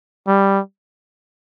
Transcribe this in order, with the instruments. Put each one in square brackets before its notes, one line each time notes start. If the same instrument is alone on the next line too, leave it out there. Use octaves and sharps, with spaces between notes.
[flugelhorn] G3